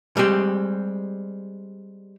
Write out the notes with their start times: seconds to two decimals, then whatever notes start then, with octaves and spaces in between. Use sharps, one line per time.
0.17 G3 G#3 C4 G4